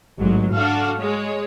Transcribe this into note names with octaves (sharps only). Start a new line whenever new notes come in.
A1 G#2 F#3
D4 F#4 A4 F5
G#3 C#5